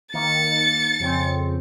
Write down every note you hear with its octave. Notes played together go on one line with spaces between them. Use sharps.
D#3 A#3 A6 C#7
F2 C#3 C4